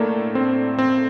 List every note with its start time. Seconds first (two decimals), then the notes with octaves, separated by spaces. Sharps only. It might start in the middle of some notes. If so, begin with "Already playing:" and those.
Already playing: A2 A3 A#3 D4
0.35 C4
0.78 C4